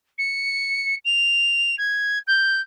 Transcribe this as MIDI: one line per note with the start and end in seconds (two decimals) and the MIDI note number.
0.18 0.95 97
1.05 1.75 101
1.78 2.18 92
2.27 2.60 91